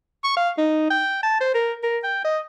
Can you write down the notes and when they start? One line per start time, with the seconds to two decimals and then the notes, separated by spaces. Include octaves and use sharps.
0.24 C#6
0.37 F5
0.58 D#4
0.90 G5
1.23 A5
1.41 C5
1.54 A#4
1.83 A#4
2.04 G5
2.24 D#5